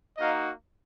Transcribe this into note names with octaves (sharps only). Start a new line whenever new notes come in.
A#3 D#4 F#4 D#5 F5